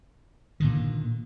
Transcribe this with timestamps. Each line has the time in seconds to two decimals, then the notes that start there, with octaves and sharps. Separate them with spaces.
0.60 A#2 D3 D#3